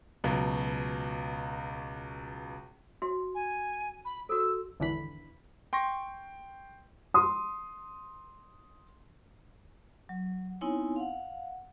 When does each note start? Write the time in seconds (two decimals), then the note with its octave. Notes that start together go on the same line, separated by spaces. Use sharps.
0.24 C#2 B2 F#3
3.02 F#4 E5 C6
3.35 G#5
4.05 B5
4.29 F#4 A4 E6
4.80 G#1 E2 D3 E3 B5
5.73 G5 C6 C#6 A#6
7.14 C6 D#6
10.09 F#3
10.61 B3 C4 D#4 E4 C#5 G#5
10.96 F5 F#5